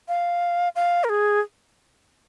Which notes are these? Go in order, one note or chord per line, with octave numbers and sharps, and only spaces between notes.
F5
F5
A#4
G#4